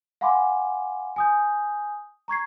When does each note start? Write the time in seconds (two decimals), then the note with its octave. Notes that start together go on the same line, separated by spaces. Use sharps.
0.21 F5 F#5 G#5 B5 C6 D6
1.16 G#5 D#6 G6
2.28 A#5 C#6 G#6 C7